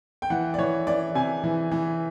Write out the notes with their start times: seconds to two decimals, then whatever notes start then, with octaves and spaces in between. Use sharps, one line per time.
0.22 G5
0.30 E3 F#5
0.54 D5
0.58 E3 C#5
0.87 E3 D5
1.15 C3 G#5
1.43 E3
1.71 E3